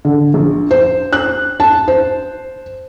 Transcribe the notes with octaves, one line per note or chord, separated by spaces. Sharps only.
D3
A#1
C5
F#6
A5
C5